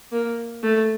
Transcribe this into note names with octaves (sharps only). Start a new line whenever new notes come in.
A#3
A3